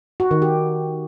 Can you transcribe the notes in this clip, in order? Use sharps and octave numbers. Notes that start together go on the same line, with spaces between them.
F#4
D#3
G4